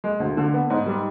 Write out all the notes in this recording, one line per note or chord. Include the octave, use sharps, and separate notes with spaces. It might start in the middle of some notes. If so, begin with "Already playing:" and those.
G#3
D2
D3
B3
G#2
G3